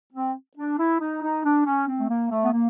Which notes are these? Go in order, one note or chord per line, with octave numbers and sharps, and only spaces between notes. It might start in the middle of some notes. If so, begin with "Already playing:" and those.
C4
D4
E4
D#4
D#4
D4
C#4
C4
A3
A#3
A3
B3
A#3